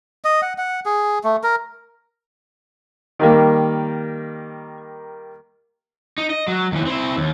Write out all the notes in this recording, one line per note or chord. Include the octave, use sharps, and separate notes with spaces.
D#5
F#5
F#5
G#4
A3
A#4
D#3 G3 A#3
D#4
D#5
F#3
D#2 E3
C4 E4
D#2